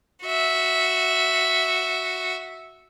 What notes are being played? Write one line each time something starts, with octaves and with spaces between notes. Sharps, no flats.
F#4 E5